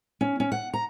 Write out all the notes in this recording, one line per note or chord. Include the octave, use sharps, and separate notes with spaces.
C#4
C#4
F#5
A#5